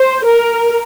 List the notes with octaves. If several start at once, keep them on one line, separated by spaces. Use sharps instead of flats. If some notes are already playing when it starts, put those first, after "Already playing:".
Already playing: C5
A#4